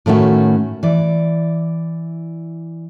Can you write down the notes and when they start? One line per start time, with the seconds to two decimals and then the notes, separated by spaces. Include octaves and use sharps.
0.06 A2 D#3 A3 C#4 F#4
0.83 E3 D5